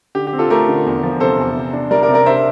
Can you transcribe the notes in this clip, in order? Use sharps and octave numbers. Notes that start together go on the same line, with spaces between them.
D3 G4
G4
C4
F4 A4
A3 G4 A#4
D3
E2
F3
C3 A4 C5
E2
C3
D4
G3 A#4 D5
A#4 D5
C3
A#4 D5
D4 C5 E5